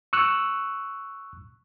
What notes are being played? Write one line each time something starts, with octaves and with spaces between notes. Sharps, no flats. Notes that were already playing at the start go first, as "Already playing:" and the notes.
C#6 E6 F#6